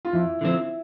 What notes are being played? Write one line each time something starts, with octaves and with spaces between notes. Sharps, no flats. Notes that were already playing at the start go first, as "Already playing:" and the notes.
F4
F2 E4
D3 F3 C4